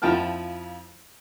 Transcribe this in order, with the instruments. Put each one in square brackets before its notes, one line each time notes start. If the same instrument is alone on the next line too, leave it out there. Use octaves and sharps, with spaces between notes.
[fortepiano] F2 F3 E4 G5 A5 F6